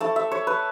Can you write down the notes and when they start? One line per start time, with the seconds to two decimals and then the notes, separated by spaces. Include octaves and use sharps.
0.01 A3 E4 A5
0.16 E5
0.31 C#5
0.47 B4